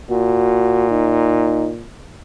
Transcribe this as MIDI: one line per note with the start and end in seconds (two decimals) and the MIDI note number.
0.10 1.87 46
0.10 0.89 66
0.91 1.70 63